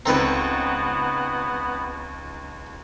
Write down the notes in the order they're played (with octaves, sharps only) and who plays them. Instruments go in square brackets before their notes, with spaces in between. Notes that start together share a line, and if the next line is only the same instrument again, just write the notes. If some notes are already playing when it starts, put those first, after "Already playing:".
[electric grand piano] C#2 D#4 A#5 [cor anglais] B3 [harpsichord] C4 A4 B4